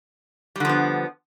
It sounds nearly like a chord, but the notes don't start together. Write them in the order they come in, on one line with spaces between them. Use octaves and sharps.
G3 D3 F3 B3